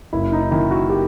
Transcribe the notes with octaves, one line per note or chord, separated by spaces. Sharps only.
F#1 E4
D#4
D#3 E4
F#4
G4